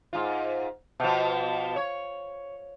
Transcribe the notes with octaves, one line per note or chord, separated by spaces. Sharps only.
G#2 F4
B2 F3
C#5